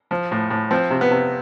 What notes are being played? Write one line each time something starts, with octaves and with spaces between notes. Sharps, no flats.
F3
A2
A2
F3 C4
C3
B3
C3